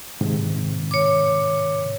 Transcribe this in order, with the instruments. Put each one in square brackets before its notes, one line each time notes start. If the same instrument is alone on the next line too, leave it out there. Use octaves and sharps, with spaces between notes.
[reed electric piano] G#2 C3 D#3
[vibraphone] C#5 D6